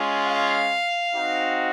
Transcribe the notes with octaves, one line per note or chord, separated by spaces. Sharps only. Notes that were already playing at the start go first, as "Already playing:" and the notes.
Already playing: G#3 C#4 F4
F5
C4 D#4 F#4